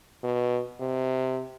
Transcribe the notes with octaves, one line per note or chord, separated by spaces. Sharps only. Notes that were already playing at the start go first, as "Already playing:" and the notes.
B2
C3